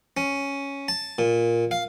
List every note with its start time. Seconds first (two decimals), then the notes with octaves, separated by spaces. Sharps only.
0.17 C#4
0.88 A5
1.18 A#2
1.71 F5